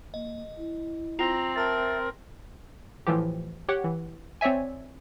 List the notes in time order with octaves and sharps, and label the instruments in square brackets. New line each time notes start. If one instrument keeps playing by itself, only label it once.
[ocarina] A#3 [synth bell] D#5
[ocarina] E4
[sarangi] C4 [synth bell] F4 [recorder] A#5
[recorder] A#4 [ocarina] E5 [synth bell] A5 A#5 A6
[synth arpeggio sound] A2 E3 F3 G4
G4 C#5 F#5
E3
C4 C#5 D5 E5 G#5